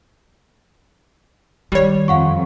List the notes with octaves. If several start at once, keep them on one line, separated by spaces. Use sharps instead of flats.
D#3 G3 G4 C#5
F2 F5 F#5 C#6